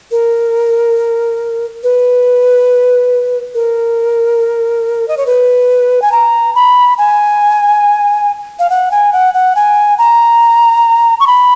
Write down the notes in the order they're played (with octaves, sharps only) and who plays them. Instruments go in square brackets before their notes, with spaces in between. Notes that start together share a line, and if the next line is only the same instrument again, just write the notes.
[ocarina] A#4
B4
A#4
D#5
C#5
B4
G#5
A#5
B5
G#5
F5
F#5
G#5
F#5
F#5
G#5
A#5
C#6
B5